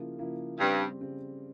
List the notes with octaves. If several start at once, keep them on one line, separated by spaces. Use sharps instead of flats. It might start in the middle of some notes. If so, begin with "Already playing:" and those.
Already playing: C#3 F3 A#3 E4
C#3 F3 A#3 E4
G2 C#3 G3 C4
C#3 G3 C4